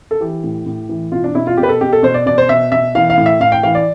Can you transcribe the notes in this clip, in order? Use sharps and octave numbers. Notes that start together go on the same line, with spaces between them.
A4
E3 G4
A2
A2
E3
B2 F4
D4
B2 E4
F4
B2 G4
B4
A4
B2 G4
A4
B2 C5
D5
B2 D5
C5
B2 E5
B2 E5
E3 F5
F5
A2
E5
A2 F5
G5
E3 F5
D5